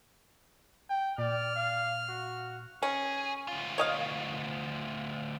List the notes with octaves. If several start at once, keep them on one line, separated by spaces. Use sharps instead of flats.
G5
A#2 D5 F6
F5
F#4
C#4 G#4
D2 F4
C#5 D#5 F5